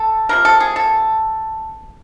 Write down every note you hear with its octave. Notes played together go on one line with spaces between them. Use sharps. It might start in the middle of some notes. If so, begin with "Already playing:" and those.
Already playing: A4
C3 F3 A#3 A#4
A4
G#4
A4